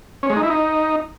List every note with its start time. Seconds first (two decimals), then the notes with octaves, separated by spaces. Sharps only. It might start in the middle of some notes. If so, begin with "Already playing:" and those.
0.23 C#4
0.30 G#3
0.36 D#4
0.43 E4
0.50 D#4